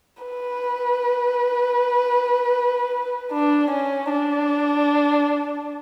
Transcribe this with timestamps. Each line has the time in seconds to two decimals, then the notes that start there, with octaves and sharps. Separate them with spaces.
0.23 B4
3.32 D4
3.70 C#4
4.10 D4